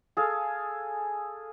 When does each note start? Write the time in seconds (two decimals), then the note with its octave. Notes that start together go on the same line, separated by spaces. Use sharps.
0.17 G#4 A4 F5